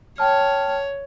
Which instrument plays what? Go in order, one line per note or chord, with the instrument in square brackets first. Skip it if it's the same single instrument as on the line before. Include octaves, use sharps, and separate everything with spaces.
[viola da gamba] C#5 [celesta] G5 A5 F6